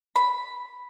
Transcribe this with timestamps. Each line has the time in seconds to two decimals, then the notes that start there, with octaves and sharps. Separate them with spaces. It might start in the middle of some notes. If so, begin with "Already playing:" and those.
0.16 B5